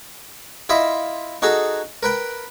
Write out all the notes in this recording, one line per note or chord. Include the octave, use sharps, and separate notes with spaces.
E4 F4 D#5 E5
D#4 F#4 G#4 A4 A#5
A#4 B4 G5